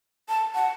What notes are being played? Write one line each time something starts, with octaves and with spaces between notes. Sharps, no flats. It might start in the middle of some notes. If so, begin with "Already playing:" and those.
A5
F#5